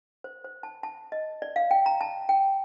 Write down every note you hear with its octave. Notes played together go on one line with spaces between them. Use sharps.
C5
C5
A5
A5
D#5
D5
F5
G5
A#5
A5
G5